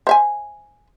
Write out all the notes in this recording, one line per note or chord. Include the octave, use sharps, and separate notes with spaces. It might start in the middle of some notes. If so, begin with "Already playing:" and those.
C5 E5 G#5